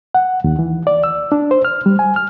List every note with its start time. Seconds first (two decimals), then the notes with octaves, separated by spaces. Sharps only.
0.15 F#5
0.44 D#2
0.59 E3
0.87 D5
1.04 E6
1.32 D4
1.51 C5
1.65 F6
1.86 G3
1.99 G#5
2.16 F6